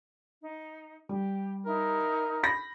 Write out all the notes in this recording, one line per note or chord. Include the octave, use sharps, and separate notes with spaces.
D#4
G3 G4
D#4 E4 A#4
B5 A#6